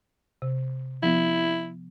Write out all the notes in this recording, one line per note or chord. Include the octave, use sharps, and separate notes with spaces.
C3
F3 B3 E4